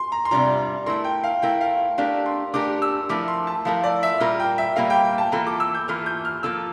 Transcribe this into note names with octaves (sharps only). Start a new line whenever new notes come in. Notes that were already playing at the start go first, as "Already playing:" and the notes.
Already playing: C6
A#5
C6
C3 G3 D4 F4 A#5
A3 E4 A#4 C6
G5
F5
A3 E4 A#4 G5
F5
A3 D4 G4 A#4 F5
C6
A3 D4 G4 A#4 D6
E6
F3 A3 E4 A#4 D6
C6
A5
F3 A3 E4 A#4 F5
D5
E5
A#2 G3 A#3 F4 A#4
G5
E5
A#2 G3 A#3 F4 A#4 F5
G5
G5
A5
E3 A#3 F4 A4 A#5
D6
E6
G6
E3 A#3 F4 A4 F6
G6
F6
F3 A#3 F4 A4 E6